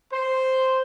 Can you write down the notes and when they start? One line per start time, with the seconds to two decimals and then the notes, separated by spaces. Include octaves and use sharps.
0.13 C5